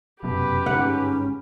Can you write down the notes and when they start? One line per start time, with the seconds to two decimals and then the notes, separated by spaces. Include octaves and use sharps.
0.23 F1 F#2 B2 G4 B4
0.66 G1 G#2 C#4 F#5